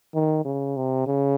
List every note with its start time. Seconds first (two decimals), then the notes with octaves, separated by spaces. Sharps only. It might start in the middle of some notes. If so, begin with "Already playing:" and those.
0.14 D#3
0.45 C#3
0.77 C3
1.07 C#3